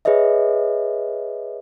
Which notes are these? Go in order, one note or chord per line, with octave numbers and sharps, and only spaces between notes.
G#4 B4 C#5 D#5 E5